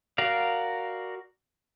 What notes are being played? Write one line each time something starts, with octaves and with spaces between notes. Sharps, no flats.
F#4 A#4 D5 F5